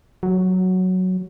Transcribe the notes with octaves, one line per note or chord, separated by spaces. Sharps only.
F#3